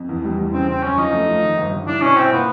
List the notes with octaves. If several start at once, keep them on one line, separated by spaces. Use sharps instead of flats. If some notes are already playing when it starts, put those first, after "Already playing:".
Already playing: F2
E2
G3
E2
C#3 C4
C#3 C4
F#2 C#4
F3 D#4
A3
F3
D#3
G1
G1
D4 E4
B2 C#4
C4 E4
A#2 B3